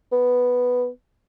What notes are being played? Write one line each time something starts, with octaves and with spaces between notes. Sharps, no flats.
B3